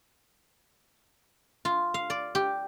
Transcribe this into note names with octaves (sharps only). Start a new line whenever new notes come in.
F4
F5
D5
G4